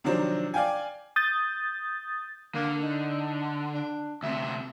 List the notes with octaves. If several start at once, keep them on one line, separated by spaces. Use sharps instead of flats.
C3 D#3 F3 F#3 D4 C5
D5 F5 G5 G#5
D#6 G6 A6
D3 A#3
D#4
D4
D2 C3 E5